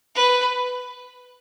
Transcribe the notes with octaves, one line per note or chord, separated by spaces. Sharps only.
B4